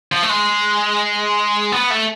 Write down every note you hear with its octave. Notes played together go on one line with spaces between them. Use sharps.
F3
A3
G#3
B3
A3